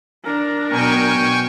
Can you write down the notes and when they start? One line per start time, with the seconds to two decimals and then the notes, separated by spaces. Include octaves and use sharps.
0.24 D4 A#4
0.70 B2 F#3 B3 G5 G#5 C#6